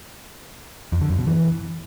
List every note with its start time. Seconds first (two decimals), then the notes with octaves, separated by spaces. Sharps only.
0.92 F2
1.01 D3
1.10 F#2
1.18 B2
1.27 E3